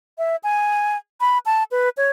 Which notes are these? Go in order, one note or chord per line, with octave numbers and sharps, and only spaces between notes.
E5
G#5
B5
A5
B4
C#5